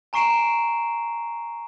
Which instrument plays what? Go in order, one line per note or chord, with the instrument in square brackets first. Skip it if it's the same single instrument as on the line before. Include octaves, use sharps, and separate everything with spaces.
[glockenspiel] G#5 A#5 C#6 C7 D7 E7